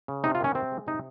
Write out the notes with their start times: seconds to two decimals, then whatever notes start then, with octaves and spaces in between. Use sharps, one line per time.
0.08 C#3
0.24 C3 D#4
0.35 F4
0.40 D#3 C#4
0.55 C3 C4
0.72 G#3
0.87 C3 D#4